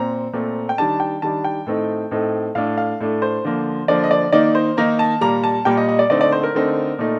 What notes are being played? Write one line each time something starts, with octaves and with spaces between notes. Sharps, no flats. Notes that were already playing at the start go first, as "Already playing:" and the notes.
Already playing: A#2 C4 A#5
A#2 A3 C4
G5
D#3 G3 D4 A5
G5
D#3 G3 D4 A5
G5
A2 A3 C4 D#4
A2 A3 C4 D#4
A2 A3 D4 F5
F5
A2 A3 D4
C5
D3 F3 A#3
D3 F3 A#3 D5
D#5
D5
D#3 A#3 D#4 D5
C5
D#3 A#3 D#4 A#5
A5
A#2 G3 A#3 A#5
A5
A#2 G3 A#3 G5
D#5
D#5
D5
D3 A3 C4 D#4 D5
D5
C5
A#4
D3 A3 C4 D#4
A#2 A3 D#4